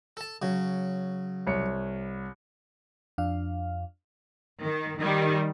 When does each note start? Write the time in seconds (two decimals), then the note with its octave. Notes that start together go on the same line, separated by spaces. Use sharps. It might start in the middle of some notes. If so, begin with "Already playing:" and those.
0.17 A4 A5
0.42 C#3 F#3
1.47 C2 C#5 C#7
3.18 F2 D4 F5
4.61 D#3
4.99 D#3 G3